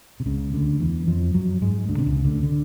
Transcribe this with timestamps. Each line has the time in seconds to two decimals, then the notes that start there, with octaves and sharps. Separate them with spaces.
0.20 C3
0.26 C#2 C#3
0.53 D2 D3
0.80 E2 E3
1.07 F2 F3
1.34 F#2 F#3
1.62 G#2 G#3
1.88 D2 D3
1.98 C3
2.06 C#2 C#3
2.24 D2 D3
2.43 D3